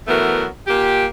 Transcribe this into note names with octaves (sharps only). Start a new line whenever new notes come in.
E3 F#3 A3 B3 A#4
A#2 A#3 G4